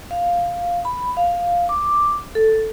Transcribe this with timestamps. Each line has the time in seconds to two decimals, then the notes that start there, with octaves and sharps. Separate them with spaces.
0.11 F5
0.85 B5
1.17 F5
1.69 D6
2.35 A4